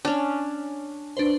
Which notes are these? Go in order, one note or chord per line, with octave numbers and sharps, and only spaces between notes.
C#4 D4
D4 B4 C5